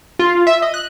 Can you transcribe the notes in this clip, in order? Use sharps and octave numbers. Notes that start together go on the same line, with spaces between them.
F4
E5
D#5
F#6